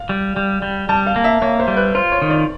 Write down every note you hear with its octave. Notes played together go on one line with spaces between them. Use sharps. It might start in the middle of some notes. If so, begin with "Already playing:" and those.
Already playing: F5
G3
G3
G3
G3 A5
F5
A#3
E5
A#3 C#5
C5
G3
B4
F4 C5
C#5
D#3
D5